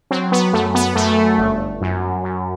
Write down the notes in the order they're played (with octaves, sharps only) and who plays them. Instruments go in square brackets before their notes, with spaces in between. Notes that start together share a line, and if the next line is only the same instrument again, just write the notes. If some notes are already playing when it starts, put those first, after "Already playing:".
[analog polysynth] F#3 C4
B3
F#2 A3
B3
F#2 A3
G1
F#2
F#2